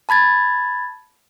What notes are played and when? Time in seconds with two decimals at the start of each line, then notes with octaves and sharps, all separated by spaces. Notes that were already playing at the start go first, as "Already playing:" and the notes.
0.09 A5 B5 G#6 A6